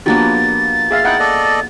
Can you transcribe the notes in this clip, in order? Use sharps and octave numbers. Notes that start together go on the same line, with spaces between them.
F3 A#3 B3 D4 F#4 G4 A6
G#4 E5 F5
D#4 E4 F#5 G5
A4 D5 D#5